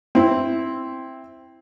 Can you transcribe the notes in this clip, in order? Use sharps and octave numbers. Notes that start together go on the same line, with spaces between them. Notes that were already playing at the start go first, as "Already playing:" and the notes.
C4 E4